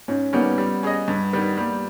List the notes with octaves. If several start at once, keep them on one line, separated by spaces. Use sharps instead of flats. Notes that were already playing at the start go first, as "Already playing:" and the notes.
G#2 C#4
D#3 G3 A#3 B3 C#4
G3
C#4 G#4 D#5
G2
D#3 G3 B3
G3 A#3